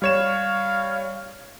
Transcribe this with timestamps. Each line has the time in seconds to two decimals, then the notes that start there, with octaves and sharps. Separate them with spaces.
0.02 G3 C#5 F5 E7